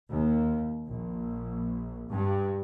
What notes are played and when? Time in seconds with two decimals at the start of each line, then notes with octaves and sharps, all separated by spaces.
0.10 D#2
0.87 A#1
2.08 G2